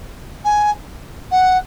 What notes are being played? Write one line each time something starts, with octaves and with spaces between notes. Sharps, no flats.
G#5
F#5